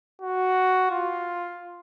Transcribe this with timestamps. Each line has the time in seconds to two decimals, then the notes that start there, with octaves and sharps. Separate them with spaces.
0.22 F#4
0.91 F4